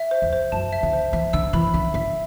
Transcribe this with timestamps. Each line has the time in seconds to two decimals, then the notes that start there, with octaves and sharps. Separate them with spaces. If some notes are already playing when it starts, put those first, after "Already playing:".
Already playing: E5
0.11 C5
0.22 E2
0.33 C5
0.52 F#2 A5
0.73 E5
0.83 D3
0.93 C5
1.13 E3 E5
1.33 D3 E6
1.53 E3 B5
1.74 D3 E5
1.94 D3 E5